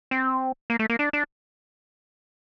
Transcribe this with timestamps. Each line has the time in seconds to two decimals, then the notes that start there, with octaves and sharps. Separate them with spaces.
0.11 C4
0.70 A#3
0.79 A3
0.90 A#3
0.99 D4
1.13 D4